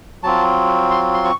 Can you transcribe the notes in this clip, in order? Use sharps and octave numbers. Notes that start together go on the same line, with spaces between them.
F#3 C4 F4 A5
C6
C6
C#6